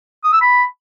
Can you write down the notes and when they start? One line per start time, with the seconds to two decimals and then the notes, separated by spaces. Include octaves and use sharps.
0.24 D#6
0.33 E6
0.41 B5